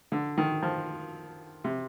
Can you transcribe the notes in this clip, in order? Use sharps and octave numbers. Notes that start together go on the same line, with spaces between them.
D3
D#3
F3
C3